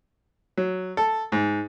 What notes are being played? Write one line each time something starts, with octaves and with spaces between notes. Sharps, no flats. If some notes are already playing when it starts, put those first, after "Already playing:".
F#3
A4
G#2